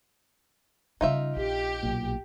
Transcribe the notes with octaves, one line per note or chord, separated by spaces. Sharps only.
C#3 G3 D#4 F4 E5
A#1 G4
B1 A#2